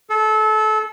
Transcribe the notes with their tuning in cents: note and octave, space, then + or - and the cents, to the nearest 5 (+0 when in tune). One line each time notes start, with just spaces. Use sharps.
A4 -25